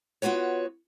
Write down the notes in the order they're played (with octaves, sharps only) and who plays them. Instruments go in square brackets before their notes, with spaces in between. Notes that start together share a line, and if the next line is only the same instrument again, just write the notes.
[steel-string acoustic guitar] B3 F4 F#4 B4 C#5